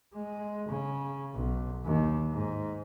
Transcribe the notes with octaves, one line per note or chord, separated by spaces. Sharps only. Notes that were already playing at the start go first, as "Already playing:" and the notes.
G#3
C#3
B1
D#2
G#2